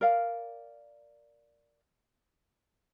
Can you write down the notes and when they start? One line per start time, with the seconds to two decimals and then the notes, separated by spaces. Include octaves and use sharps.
0.01 A#4 D5 F5